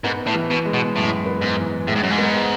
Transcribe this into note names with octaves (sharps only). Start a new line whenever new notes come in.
G#2 B3
A2
E3
B2
G#3
B2
F#2 A2
B3
G#2
E3
A2 G#3
G#2
F#2
G#2
B3